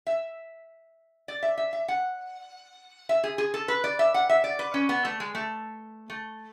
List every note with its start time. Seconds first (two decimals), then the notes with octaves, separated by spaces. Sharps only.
0.07 E5
1.28 D5
1.43 E5
1.57 E5
1.73 E5
1.88 F#5
3.09 E5
3.24 G#4
3.38 G#4
3.54 A4
3.68 B4
3.84 D5
3.99 E5
4.14 F#5
4.29 E5
4.44 D5
4.59 B4
4.74 C#4
4.89 B3
5.05 A3
5.20 G#3
5.35 A3
6.10 A3